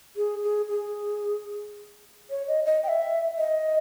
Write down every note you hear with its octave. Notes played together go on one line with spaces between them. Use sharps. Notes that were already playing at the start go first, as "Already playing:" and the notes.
G#4
G#4
G#4
C#5
D#5
D#5
G5
E5
D#5